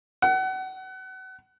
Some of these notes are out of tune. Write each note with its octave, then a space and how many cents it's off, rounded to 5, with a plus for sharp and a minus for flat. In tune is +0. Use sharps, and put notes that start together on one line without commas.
F#5 +30